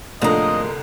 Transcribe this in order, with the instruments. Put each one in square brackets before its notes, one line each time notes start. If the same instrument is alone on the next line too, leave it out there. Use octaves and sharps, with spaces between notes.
[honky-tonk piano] C2 D3 [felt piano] A2 F3 A#3 [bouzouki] G#3 A#4 [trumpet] D#5